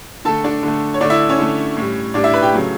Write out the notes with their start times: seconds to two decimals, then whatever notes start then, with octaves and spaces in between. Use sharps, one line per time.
0.25 D3 A3 A4 A5
0.44 D4 D5
0.63 D3 A3
0.94 C#5
1.01 D3 A3 D4 D5
1.10 E4 E5
1.29 C#4 C#5
1.39 D3 A3
1.77 A2 G3
2.14 A2 G3 D4 D5
2.24 E4 E5
2.33 B4 B5
2.42 G4 G5
2.53 C#3 F#3 A3